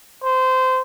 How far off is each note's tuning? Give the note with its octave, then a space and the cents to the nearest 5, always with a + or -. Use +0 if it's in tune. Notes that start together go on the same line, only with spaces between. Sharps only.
C5 -20